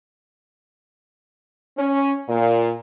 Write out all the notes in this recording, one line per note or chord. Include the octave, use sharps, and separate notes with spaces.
C#4
A#2